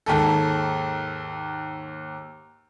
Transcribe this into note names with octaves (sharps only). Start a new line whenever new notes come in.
D#2 G#2 A4